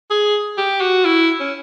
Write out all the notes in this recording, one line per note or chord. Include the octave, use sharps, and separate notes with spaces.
G#4
G4
F#4
E4
C#4